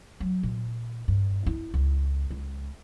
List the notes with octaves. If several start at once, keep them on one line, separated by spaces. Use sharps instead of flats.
F#3
A#2
G2
E4
C#2
C#2